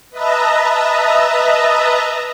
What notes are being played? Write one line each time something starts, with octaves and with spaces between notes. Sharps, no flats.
B4 D#5 E5 A5 A#5